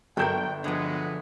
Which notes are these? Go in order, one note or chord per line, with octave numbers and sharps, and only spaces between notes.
G1 F#3 A4 A#4 G5 G6
D3 F3 F#3 G#3 B3